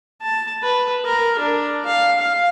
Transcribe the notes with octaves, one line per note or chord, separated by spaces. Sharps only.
A5
B4
A#4
D4
F5
F5